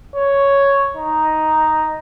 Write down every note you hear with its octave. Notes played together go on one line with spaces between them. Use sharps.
C#5
D#4